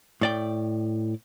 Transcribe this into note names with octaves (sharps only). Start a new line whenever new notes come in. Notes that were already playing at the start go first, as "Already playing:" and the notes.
A2 D5 G5